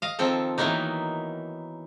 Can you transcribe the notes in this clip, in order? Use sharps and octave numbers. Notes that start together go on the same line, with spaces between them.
D#5 F5
D#3 F3 C4 A4
D#3 E3 F#3 A#3 B3 D#4